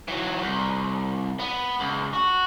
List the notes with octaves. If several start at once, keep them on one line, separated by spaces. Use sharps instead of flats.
E3 F#3
C2
B3
C#2
F#4